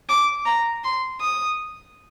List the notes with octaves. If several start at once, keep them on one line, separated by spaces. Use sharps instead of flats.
D6
A#5
C6
D#6